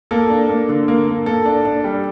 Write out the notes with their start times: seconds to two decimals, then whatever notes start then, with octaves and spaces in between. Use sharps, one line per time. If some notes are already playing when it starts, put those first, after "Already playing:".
0.11 A#3 A4
0.30 D4
0.49 A#3
0.69 D3
0.88 A#3
1.07 A#3
1.26 A#3 A4
1.46 D4
1.65 D4
1.84 G3